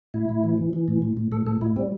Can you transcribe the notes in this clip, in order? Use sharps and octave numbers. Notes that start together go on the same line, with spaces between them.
A2 E4
A2
E3
E3
E3
A2
A2
A2
A2 A4
A2 A4
A2 E4
G3 C4